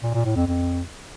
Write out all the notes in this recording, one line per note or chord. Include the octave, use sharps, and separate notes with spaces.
A#2
A#2
A2
F2
F2